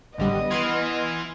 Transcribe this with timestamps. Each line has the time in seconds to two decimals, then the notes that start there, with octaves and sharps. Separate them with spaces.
0.18 A1 D3 G3 B3 B4 D#5
0.51 E3 C6 F6 G#6